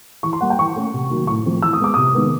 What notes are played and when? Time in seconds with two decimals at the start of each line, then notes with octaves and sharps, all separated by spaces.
0.23 E3 C#6
0.33 C6
0.41 G3 A#3 F#5
0.50 G5
0.59 E3 C#6
0.76 A3 C#4
0.94 C3
1.10 D#3 F#3 A#3
1.27 A2 C#6
1.46 F3 A3 C4
1.62 E3 E6
1.73 D#6
1.80 G#3 B3 D6
1.94 C3 D#6
2.15 D#3 G#3 B3